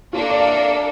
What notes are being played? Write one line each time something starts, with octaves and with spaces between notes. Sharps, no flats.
A#3 D4 F4 A4
D5
F5
E5